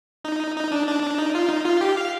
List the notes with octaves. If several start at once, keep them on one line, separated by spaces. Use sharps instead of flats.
D#4
D#4
D4
D4
D4
D#4
F4
D#4
F4
G4
F5